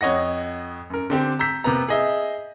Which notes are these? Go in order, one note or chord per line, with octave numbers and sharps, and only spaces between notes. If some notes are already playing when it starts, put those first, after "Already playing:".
F2 C#5 D#5 F#5 A#6
F#2 A#4
D3 C4 G4
A#5 E6 G6 B6
C3 A#3 B3 B4 A#5
G#4 D#5 E5